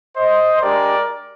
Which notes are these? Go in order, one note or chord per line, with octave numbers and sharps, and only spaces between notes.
C5 D#5
G#3 D4 G4 A#4 D5